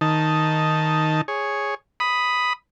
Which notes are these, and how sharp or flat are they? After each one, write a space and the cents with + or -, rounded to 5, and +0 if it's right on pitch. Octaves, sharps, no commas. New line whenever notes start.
D#3 +5 D#4 +0 A5 +0
G#4 +0 C#5 +0
B5 +0 D#6 +0